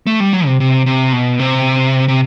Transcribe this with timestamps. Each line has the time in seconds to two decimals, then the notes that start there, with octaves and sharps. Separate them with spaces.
0.07 A3
0.20 G3
0.33 F#3
0.46 C3
0.60 C3
0.86 C3
1.12 B2
1.39 C3
2.08 C3